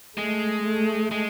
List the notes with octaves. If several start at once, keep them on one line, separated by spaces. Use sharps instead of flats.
G#3 A3
A3
G#3